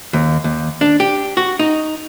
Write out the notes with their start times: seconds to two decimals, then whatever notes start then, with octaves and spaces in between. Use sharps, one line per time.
0.13 D#2
0.44 D#2
0.81 D4
1.00 G4
1.37 F#4
1.59 D#4